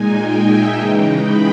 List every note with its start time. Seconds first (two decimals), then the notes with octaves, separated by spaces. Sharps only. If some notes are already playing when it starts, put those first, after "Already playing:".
Already playing: A#2 G#3 D#4 G#5
0.16 G5
0.47 E5
0.77 C#3 E3 G#3 D#4 G5
1.22 B5